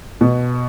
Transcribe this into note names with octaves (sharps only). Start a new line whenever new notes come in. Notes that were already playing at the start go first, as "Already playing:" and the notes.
B2